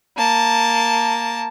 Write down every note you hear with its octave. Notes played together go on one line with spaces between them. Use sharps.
A#3 A5